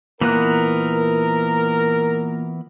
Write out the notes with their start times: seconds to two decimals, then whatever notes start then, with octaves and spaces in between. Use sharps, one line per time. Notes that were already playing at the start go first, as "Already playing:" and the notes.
0.21 A#2 E3 B3 A#4 F#6